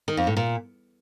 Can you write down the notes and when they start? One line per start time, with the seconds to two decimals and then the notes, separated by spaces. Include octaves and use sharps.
0.08 D#3
0.17 F2
0.27 A2
0.37 A#2